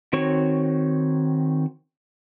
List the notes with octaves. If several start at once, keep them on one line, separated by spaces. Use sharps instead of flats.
D#3 C4 F#4 C#5 C#6